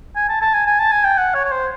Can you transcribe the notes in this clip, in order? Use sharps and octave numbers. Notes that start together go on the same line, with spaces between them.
G#5
A5
A5
G#5
G#5
A5
G#5
G5
F#5
C#5
C#5
C5